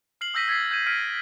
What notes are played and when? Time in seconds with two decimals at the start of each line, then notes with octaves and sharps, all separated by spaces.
0.21 F6 C7 F#7
0.34 D#6 E6 G6 A#6 B6 D#7
0.48 E6 G#6 A6 B6 C7
0.71 G6 G#6 D#7
0.86 E6 F6 G#6 B6 D7 D#7